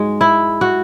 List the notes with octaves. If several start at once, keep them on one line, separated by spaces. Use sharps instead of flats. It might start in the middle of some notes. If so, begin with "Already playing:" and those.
Already playing: G#2 F#3 G#3
E4
F#4